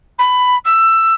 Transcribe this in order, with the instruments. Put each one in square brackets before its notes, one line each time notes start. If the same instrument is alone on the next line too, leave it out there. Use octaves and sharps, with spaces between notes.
[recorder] B5
E6